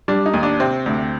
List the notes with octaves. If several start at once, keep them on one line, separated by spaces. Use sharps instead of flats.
G3 D4
D#4
D#2
D4
C3 C4
D2